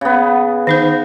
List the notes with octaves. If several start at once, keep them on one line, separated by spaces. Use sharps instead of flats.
C#3 B3
D#3 D#4 C5